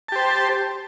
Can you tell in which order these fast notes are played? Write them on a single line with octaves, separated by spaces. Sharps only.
A5 G4 C5